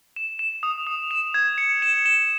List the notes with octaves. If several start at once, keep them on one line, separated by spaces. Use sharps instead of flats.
E7
E7
D#6
D#6
E7
G#6
C#7
E7
E7